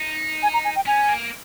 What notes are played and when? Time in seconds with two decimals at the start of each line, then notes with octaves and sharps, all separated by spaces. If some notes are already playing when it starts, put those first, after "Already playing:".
Already playing: D#4
0.43 G#5
0.54 A#5
0.65 G#5
0.76 G5
0.86 C#4 G#5
1.09 A#3